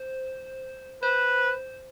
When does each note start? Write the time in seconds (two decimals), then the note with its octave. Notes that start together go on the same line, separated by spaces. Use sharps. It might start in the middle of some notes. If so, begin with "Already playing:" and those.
Already playing: C5
1.03 B4 C5